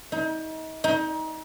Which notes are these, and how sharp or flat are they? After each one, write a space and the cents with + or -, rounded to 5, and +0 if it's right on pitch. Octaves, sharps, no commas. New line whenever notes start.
D#4 +35
D#4 +30